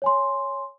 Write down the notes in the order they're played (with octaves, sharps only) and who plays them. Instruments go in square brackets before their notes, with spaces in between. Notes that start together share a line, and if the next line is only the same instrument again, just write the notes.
[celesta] C#5 G#5 C6